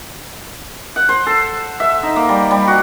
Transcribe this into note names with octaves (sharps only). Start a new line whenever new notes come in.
F#5
C5
A4
E5
D#4
A#3
G3
G3
F#4